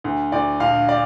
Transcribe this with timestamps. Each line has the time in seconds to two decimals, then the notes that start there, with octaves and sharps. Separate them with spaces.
0.04 D2
0.32 D2 D5
0.60 A#1 F5
0.89 D5